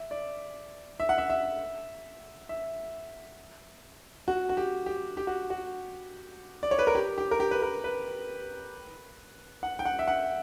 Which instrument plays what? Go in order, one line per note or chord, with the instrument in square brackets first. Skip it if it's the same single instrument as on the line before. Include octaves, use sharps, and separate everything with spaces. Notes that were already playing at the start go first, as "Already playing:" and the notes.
Already playing: [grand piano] E5
D5
E5
F#5
E5
E5
E5
F#4
F#4
G4
G4
G4
F#4
F#4
D5
C#5
B4
A#4
G4
G4
A#4
G4
B4
A#4
B4
F#5
G5
F#5
E5
F#5